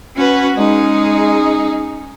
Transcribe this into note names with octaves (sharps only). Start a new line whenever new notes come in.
C#4 F#4 B4
G#3 C#4 D#4 G#4